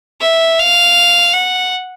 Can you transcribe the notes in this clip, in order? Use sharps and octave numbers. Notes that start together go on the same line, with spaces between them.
E5
F5
F#5